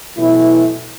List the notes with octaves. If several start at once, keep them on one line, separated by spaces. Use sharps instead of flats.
B2 E3 F#3 A3 E4